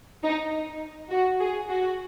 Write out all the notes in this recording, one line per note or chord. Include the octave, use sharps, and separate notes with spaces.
D#4
F#4
G#4
F#4